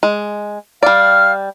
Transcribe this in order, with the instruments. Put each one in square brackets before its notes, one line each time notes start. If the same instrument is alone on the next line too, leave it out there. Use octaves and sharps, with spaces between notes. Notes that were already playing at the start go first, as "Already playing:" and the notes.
[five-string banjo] G#3
[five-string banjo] G3 D5 [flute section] F5 F6